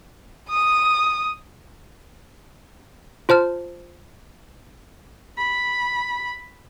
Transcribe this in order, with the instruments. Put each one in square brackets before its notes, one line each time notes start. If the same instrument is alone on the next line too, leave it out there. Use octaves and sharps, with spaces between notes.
[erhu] D#6
[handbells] F4 C5 A5 F6
[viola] B5